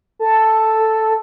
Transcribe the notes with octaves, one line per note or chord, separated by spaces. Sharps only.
A4